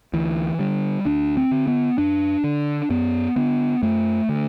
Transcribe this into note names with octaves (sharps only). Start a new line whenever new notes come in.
D2 E3
D3 G3
D2 D4
C4
D3
B3
F#2 D4
D3
F#2 B3
D3 B3
F#2 A3
D3